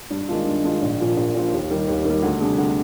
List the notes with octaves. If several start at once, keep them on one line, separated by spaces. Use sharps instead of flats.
G2
D#3 G#3 D4 F4
G2
D#3 G#3 D4 F4
A#1
A#2 F3 A#3 F4
A#1
A#2 F3 A#3 F4
D#2
D#3 G3
D#2
D#3
G3
D2
C3 G3 D4 G#4
D2